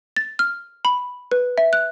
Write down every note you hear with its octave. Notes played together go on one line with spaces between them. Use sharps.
A6
F6
B5
B4
E5
F#6